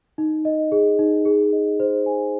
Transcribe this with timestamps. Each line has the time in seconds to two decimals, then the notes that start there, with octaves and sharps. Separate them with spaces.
0.18 D#4
0.45 D#5
0.72 G#4
0.99 D#4
1.25 G#4
1.52 D#5
1.80 C5
2.06 G#5